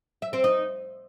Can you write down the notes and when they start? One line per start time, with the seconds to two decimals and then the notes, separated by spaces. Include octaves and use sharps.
0.22 E5
0.33 C4
0.44 D#4